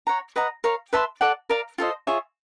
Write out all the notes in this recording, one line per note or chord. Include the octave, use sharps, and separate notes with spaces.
C#5 F#5 A#5
B4 D#5 F#5 A#5
A#4 C#5 F5
B4 E5 A5 C6
A4 D5 F#5
A#4 D5 F5 A#5
F4 A4 C5 D#5
F4 G#4 C#5 E5